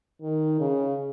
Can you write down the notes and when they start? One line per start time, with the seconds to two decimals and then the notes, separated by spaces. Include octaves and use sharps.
0.22 D#3
0.60 C#3